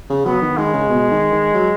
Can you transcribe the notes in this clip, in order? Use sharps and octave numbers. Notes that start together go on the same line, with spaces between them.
C#3
F#3 B3
D#3
D#3 G#3
C#3
B2
D#3
D#3
F#3